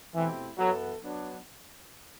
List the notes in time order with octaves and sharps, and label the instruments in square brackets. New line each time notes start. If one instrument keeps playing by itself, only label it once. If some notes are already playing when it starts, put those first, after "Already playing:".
[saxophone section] B2 A3 C4 E4 G4 [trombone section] E3
[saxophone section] F#2 E3 B3 F#4 A4 [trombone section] F#3
[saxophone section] F#3 B3 D4